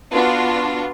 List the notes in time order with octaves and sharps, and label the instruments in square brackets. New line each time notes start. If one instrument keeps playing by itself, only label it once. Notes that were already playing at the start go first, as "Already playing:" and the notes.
[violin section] B3 D4 F4 F#4